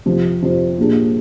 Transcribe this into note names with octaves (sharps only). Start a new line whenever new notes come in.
F2 C3 F3
F2 C3 F3
A#2 G3 A#3 D4 G#4